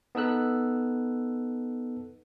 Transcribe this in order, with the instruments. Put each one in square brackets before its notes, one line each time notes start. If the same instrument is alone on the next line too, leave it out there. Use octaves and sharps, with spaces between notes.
[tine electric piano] B3 D#4 A4 E6 F#6